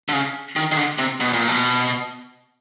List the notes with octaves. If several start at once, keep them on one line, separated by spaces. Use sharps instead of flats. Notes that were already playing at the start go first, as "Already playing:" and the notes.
D3
C#3
D#3
D#3
D3
C3
B2
A#2
B2